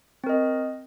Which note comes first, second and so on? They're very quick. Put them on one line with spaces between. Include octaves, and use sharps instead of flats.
C4 A#4 D#5